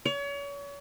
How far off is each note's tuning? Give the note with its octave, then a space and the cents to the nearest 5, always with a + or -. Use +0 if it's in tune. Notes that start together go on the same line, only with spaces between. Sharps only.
C#5 +35